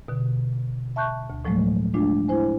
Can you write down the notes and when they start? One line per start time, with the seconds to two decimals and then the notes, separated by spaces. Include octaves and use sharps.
0.08 B2 D3
0.96 E5 A5 C#6 F#6 G6
1.30 D2
1.45 A2 F3 F#3 G#3 A3
1.94 G#3 A3 D4 F4
2.28 E4 C5 G#5